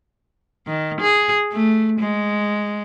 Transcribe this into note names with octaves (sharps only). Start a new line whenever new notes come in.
D#3
G#4
A3
G#3